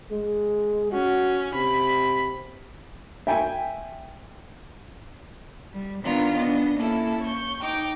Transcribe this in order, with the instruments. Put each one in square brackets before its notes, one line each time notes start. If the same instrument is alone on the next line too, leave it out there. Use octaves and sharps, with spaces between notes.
[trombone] G#3
[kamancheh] C#4 [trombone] F#4
[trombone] C3 [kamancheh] B5
[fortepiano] E5 G5 G#5
[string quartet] G3
D#3 B3 D4 F4 A#4
B3 D4 D#5
A#3 C#4 E4 A4
C#6 G6
D#4 G5 D6